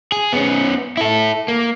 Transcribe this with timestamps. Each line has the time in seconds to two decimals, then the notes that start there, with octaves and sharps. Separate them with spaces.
0.12 G#4
0.33 B3 C#4
0.97 E4 A4
1.48 A#3